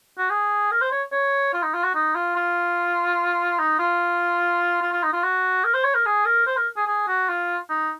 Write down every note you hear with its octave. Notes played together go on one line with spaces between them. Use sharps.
F#4
G#4
A#4
C5
C#5
C#5
F4
D#4
F4
F#4
D#4
F4
F4
D#4
F4
F4
F4
D#4
F4
F#4
A#4
C5
C#5
A#4
G#4
A#4
C5
A#4
G#4
G#4
F#4
F4
D#4